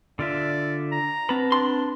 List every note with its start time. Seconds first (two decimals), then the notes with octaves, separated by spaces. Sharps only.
0.19 D3 F4 D5 E5
0.92 A#5
1.29 C4 B4 A5 B5
1.52 D4 C6